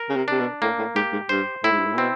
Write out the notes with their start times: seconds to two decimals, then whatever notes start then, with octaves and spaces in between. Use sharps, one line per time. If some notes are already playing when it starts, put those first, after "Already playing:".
Already playing: A#4
0.09 C#3
0.16 C3
0.28 C3 D4
0.39 B2
0.62 A2 A#3
0.78 A2
0.95 G#2 G4
1.13 G#2
1.29 G2 C5
1.63 A2 E4
1.71 G#2
1.79 G2
1.86 G#2
1.93 A#2
1.98 B2 C4